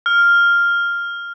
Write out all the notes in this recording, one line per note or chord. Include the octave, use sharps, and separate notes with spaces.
F6